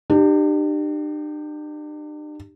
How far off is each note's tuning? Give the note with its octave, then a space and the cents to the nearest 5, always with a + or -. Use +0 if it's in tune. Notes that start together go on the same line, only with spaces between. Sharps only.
D4 +45 G4 +0